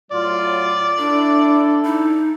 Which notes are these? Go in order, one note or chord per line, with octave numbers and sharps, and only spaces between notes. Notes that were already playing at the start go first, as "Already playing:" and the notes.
A2 F#3 F4 D5
D4 E4 A4
D#4